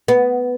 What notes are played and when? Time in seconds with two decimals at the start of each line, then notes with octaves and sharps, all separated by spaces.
0.08 B3